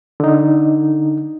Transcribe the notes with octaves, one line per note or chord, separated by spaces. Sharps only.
D3 D#4